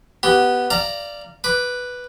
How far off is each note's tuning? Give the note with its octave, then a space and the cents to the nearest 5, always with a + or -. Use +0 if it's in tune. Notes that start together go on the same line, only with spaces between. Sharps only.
B3 +0 G4 -15
D5 +0 F5 -20 A#5 +0
B4 +0 D6 +0